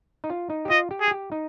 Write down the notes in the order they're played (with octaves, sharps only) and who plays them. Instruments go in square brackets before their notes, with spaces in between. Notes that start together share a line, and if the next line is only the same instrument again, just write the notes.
[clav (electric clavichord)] D#4
F4
D#4
G4
[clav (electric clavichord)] F4 [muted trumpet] D#5
[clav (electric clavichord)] G4
[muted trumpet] G#4
[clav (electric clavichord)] G4
D#4